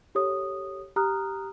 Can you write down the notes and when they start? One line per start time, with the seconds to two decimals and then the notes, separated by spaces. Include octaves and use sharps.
0.15 G4 A4 C#5 D#6
0.96 G4 A#5 D#6 F6 F#6